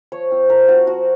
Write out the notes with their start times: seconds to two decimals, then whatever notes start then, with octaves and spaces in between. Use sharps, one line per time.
0.12 F3 C#5
0.31 C4 F4
0.49 F3 A#4
0.68 C4 F4 F#4
0.87 F3 F#4